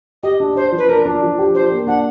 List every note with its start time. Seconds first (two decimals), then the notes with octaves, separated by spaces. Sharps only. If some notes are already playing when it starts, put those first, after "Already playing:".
0.23 G4 D#5
0.40 D4
0.55 D4 C5
0.72 F3
0.78 B4
0.89 D4 A#4
1.05 D4
1.22 F3
1.39 G4
1.55 D4 C5
1.72 A#3
1.87 D4 F#5